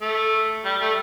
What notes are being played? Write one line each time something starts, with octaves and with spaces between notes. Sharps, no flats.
A3
G3
A3